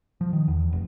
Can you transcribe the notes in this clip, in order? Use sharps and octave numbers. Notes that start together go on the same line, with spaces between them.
F3
D#3
E2
F1